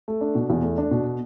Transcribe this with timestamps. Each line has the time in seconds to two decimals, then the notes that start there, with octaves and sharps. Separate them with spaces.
0.08 A3
0.21 D4
0.35 B2
0.50 E2
0.63 A3
0.78 D4
0.91 B2